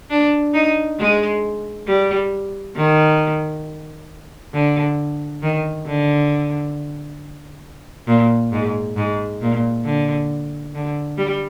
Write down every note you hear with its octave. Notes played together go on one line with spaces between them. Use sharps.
D4
D#4
G#3
G3
D#3
D3
D#3
D3
A#2
G#2
G#2
A#2
D3
D3
G3